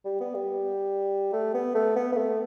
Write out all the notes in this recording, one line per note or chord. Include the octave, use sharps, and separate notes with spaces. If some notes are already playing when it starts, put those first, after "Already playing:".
G3
B3
G3
A3
B3
A3
B3
B3
A3